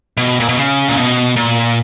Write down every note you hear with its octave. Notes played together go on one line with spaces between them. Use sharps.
B2
A#2
B2
C#3
A#2
B2
A#2